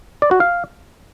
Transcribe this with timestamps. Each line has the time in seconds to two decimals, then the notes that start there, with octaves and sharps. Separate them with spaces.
0.22 D5
0.31 F#4
0.40 F5